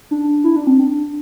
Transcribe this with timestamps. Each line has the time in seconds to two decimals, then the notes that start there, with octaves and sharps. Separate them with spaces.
0.11 D4
0.44 E4
0.56 D4
0.67 C4
0.79 D4